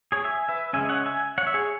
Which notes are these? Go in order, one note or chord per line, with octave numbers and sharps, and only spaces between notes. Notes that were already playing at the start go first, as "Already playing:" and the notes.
G#4 C#5
E5 G#5
B4 E5
C#3 G#3 C#4 E5 G#5
C#5 F#5
E5 G#5
C#5 F#5
E5
G#4 C#5